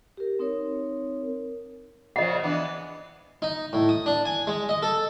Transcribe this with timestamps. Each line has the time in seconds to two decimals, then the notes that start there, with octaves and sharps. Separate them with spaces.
0.17 G4 A#4
0.39 C4 D#4 A#4 C#5
2.16 A#2 C#3 F3 D#5 F#5
2.43 E3 B3 D4
3.42 D#4
3.73 A2
3.89 D#6
4.06 D4
4.25 G#5
4.47 G#3
4.69 D#5
4.83 A4